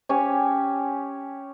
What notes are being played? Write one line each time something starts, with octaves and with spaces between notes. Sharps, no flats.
C#4 G4 C#5 G#5